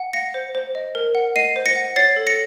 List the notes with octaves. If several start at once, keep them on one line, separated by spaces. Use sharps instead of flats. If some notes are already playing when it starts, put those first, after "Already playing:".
Already playing: F#5
F5 A#6 C#7
C5
C5
D#5
A#4
F#5
D#5 C7 D#7
C5
A#6 C#7
F#5
C#5 A6 C7
A4
A#6 C#7